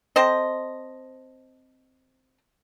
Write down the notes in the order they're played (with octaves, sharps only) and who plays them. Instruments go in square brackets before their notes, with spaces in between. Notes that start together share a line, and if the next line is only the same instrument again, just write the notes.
[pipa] C4 A4 C5 D#5